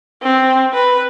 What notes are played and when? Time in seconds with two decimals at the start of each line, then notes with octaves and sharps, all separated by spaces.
0.23 C4
0.74 B4